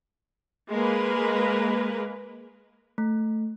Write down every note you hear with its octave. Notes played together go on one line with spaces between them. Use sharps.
G#3 A#3 A#4 B4
A3